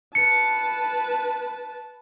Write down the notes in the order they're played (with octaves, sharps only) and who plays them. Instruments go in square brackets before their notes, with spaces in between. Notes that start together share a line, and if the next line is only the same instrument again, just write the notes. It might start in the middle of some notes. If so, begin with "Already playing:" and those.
[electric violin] B4 A5 [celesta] C#7